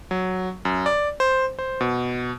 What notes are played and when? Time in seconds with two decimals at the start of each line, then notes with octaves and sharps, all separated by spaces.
0.11 F#3
0.65 F#2
0.86 D5
1.20 C5
1.59 C5
1.81 B2